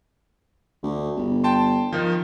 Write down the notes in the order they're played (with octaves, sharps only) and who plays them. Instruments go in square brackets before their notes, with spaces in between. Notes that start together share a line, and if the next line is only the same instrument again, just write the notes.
[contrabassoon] D2
G1
[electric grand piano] G5 A5 C6
D#3 F3